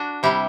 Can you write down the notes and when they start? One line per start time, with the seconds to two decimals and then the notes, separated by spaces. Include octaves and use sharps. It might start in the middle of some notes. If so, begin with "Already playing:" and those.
Already playing: D4 F#4
0.23 C3 G3 E4 G4